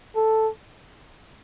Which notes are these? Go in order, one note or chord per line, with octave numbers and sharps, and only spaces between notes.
A4